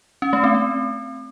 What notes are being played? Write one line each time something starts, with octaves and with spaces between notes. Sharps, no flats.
C#4
A3
C4
C4